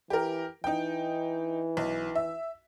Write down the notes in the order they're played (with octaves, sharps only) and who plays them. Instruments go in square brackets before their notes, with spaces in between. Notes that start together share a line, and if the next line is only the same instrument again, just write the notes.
[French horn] E3 [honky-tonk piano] G4 A#4
[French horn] E3 [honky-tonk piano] D#4 G5
[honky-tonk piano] B1
E5